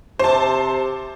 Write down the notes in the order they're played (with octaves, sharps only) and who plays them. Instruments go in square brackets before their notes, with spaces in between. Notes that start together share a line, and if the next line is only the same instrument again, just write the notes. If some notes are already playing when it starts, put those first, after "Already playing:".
[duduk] C3 [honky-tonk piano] C5 A5